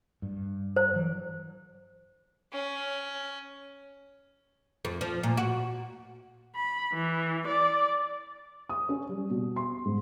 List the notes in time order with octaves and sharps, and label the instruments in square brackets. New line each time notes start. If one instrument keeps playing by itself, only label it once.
[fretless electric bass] G2
[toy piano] C5
[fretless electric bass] E3 F#3
[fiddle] C#4
[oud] F2
F3
A#2
F#4
[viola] B5
E3
D5
[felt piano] D#6
C#4
G3
B2
C6
G#2